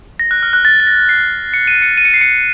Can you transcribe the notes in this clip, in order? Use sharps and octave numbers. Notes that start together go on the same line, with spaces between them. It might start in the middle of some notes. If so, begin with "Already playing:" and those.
A#6
F#6
F6
F#6
A6
A6
A#6
C7
C#7
D#7
C#7
D#7
C#7
C7
C#7